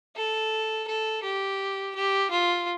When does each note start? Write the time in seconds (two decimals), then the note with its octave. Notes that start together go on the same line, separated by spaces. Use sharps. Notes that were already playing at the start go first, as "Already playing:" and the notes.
0.16 A4
0.88 A4
1.23 G4
1.95 G4
2.31 F4